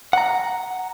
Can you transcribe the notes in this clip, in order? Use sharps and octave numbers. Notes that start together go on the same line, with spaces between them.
F#5 A#5